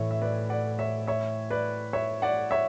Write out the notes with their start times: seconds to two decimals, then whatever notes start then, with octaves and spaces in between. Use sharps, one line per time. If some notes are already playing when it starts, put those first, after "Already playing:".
Already playing: A2 E3 A3 C#5 E5
0.11 E5
0.22 B4 D5
0.50 D5 F#5
0.79 C#5 E5
1.08 C#5 E5
1.51 B4 D5
1.93 C#5 E5
2.22 D5 F#5
2.51 C#5 E5